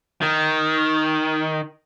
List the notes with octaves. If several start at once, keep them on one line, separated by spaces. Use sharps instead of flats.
D#3